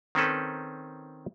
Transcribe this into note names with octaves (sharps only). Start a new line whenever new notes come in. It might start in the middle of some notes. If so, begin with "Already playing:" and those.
D#3 C4 C#4 A4 B4